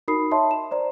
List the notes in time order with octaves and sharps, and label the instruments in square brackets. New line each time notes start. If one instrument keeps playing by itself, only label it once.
[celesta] D#4 F#4 A#4 B5 D#6 C7
C#5 D#5 E5 A5 C6
E7
C5 D5 A#5